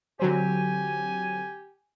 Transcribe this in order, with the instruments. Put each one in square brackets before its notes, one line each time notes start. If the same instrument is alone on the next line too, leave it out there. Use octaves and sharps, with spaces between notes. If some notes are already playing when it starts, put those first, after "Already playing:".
[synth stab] D3 F#3 C4 [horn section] G4 G#5